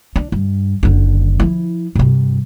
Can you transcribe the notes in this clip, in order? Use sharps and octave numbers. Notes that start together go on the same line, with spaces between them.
D4
G2
F#1 D3
F3 E4
G2 C3